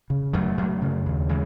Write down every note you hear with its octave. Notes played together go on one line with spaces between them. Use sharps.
C#3
F#2 F#3 A3
F#2
C#3
D#2
C#3 E3 G#3